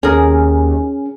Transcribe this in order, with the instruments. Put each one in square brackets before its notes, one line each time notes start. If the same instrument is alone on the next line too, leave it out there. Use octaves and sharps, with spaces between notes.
[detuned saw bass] D#2 [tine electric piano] C#4 [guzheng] G#4 A#4